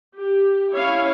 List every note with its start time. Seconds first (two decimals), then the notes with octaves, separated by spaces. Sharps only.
0.16 G4
0.74 C#4 E4 C#5 F5